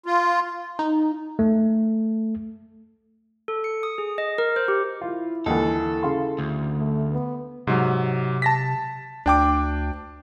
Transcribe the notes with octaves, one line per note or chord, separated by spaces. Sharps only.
F4
D#4
A3
A4
C#7
D#6
G#4
D#5
A#4
C5
G4
E4 F4
D#2 D3 E3 A4
C#3 F5 C6
D2
A3
B3
G#2 C3 F#3
A5 A#6 B6
D2 D4 G5 D6